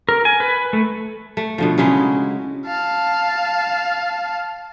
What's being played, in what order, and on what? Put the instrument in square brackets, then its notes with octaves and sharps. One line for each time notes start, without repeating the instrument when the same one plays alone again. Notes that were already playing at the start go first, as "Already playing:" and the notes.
[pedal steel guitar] A#4
G#5
B4
A3
[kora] A3
B2 D3 F3
C#3 F#3 G#3 E4
[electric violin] F5 A5